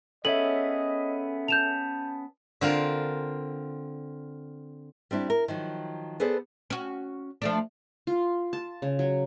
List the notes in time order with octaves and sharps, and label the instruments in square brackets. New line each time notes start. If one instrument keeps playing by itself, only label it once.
[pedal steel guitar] B3 C#4 G#4 [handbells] A4 C#5 E5 [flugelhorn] D#5 [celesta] F#7
[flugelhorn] A5 [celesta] G6 E7 F7
[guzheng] D3 C4 F4 A#4
[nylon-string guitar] G3 C4 D4 E4
A#4
D#3 F3 F#3
B3 G#4 A4 B4 C5 D5
[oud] C#4 F#4
F3 A3 D4
[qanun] F4
A5
C#3
F#3